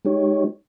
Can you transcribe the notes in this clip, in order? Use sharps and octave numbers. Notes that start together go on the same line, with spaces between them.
G#3 D#4 G4 C#5